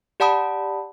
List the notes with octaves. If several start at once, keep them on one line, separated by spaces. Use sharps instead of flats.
G4 D5 F#5 A5 B5 D#6